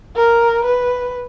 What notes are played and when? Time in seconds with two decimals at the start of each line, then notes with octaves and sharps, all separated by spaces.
0.16 A#4
0.64 B4